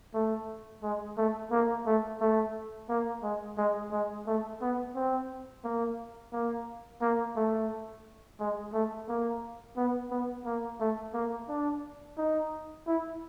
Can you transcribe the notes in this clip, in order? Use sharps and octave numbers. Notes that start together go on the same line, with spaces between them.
A3
G#3
A3
A#3
A3
A3
A#3
G#3
G#3
G#3
A3
B3
C4
A#3
A#3
A#3
A3
G#3
A3
A#3
B3
B3
A#3
A3
A#3
D4
D#4
E4